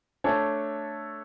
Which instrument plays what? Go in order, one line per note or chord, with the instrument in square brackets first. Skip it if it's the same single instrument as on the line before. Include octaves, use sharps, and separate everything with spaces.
[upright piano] A3 D4 A4 C#5